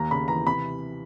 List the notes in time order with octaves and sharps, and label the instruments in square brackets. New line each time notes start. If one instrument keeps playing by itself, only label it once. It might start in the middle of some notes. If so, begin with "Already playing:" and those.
Already playing: [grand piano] D#2 A#5
C#3 B5
E3 A#5
C3 B5